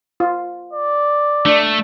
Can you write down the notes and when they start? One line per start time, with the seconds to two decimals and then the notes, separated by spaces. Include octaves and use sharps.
0.20 F4
0.73 D5
1.46 A3 D4